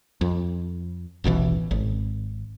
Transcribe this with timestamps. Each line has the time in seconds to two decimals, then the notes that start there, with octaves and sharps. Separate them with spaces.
0.21 F2
1.24 D#1 A1 B2 E3
1.71 G#1